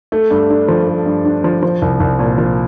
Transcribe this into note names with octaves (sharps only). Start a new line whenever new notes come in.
A3
G2
D4
F3
A3
G2
D4
F3
F3
C2
C2
A#2
F3